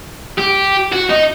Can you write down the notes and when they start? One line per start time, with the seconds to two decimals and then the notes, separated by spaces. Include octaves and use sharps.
0.38 G4
0.92 F#4
1.10 D#4